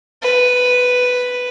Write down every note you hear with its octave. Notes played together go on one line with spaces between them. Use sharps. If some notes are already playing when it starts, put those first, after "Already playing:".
B4